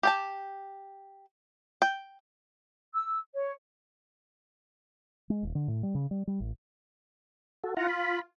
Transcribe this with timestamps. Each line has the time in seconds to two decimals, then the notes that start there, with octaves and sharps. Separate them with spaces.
0.03 G4 G5 A5
1.82 G5
2.94 E6
3.35 C#5
5.30 G#3
5.43 D#1
5.55 D3
5.68 A2
5.83 G3
5.95 C#3
6.11 G3
6.27 G3
6.40 A1
7.64 F#4 A4
7.77 E4 F4 F#5 A#5
7.88 B5